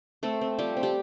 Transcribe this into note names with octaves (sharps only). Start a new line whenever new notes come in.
A3 C4 A4
C4
F3 G3 G4
C4
G4